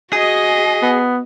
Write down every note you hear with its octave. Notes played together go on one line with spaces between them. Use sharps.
F#4 G#4 D#5
B3